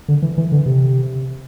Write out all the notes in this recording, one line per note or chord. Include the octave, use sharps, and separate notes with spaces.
D3
E3
E3
D3
C3